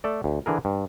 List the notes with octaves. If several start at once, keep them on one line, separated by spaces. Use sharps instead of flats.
A3 A4 D5
D2
D3 E3 G#4 A#4
G2